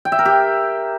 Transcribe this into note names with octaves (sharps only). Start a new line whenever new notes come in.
G5
E5
A#4
G4